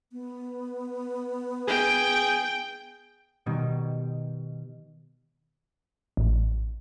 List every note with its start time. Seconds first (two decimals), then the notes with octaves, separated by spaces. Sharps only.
0.12 B3
1.68 G#4 G5
3.46 B2 D#3 G3
6.17 A1